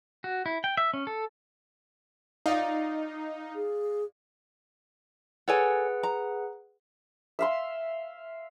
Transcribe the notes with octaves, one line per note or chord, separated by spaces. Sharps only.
F#4
E4
G5
E5
C#4
A4
D#4 F4 D5 F5
G#4
G#4 A4 B4 C#5 F#5 G#5
A#5
E5 F5 C6